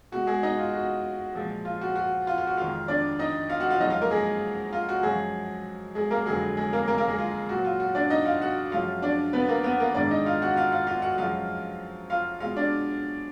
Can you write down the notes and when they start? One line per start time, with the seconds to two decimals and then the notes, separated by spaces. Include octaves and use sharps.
0.12 B2 G#3 F#4
0.27 G#3 G#4
0.43 D#4 D#5
0.58 F4
0.74 F#4
1.35 A#2 F3 G#3
1.65 F4
1.81 F#4
1.96 F#4
2.27 F4
2.38 F4
2.47 F#4
2.57 F2 D#3 G#3 F4 F5
2.88 D4 D5
3.19 D#4 D#5
3.50 F4 F5
3.60 F#4 F#5
3.70 F4 F5
3.80 F#2 F3 G#3 D#4 D#5
3.90 F4 F5
4.01 A#3 A#4
4.11 G#3 G#4
4.73 F4
4.89 F#4
5.03 F#2 F3 G#3 G#4
5.95 G#3 G#4
6.11 A#3 A#4
6.26 F2 D3 F#3 G#3 G#4
6.57 G#3 G#4
6.73 A#3 A#4
6.88 A#3 A#4
6.98 A#3 A#4
7.08 G#3 G#4
7.18 F4
7.49 A#2 F#3 F#4
7.65 F4
7.80 F#4
7.95 D4 D5
8.10 D#4 D#5
8.26 F4 F5
8.42 F#4 F#5
8.72 F#2 F3 G#3 F4 F5
9.02 D4 D5
9.33 B3 B4
9.48 A#3 A#4
9.64 B3 B4
9.80 A#3 A#4
9.95 G#2 D#3 G#3 D4 D5
10.11 D#4 D#5
10.26 F4 F5
10.42 F#4 F#5
10.56 F4 F5
10.72 F4 F5
10.87 F4 F5
11.02 F#4 F#5
11.18 F#2 F3 G#3 F4 F5
12.10 F4 F5
12.40 B2 G#3 F4 F5
12.56 D4 D5